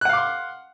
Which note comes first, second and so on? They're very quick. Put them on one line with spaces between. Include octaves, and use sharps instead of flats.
F#6 F#5 F5 D6 C6